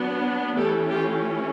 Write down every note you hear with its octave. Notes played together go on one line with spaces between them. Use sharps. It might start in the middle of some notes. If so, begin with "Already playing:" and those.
Already playing: F#3 B3 D4
E3 A3 C#4 G4 A4
F4 G4